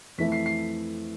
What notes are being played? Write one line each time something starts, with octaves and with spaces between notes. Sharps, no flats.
F2 E3 A3 B6
C7
C7